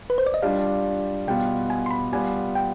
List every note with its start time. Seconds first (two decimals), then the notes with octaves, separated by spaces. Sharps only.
0.10 B4
0.18 C5
0.26 D5
0.34 D#5
0.42 G3 D4 F4 F5
1.27 B2 G3 B3 F4 G5
1.70 G#5
1.86 C6
1.91 B5
2.12 G3 B3 F4 G#5
2.55 G5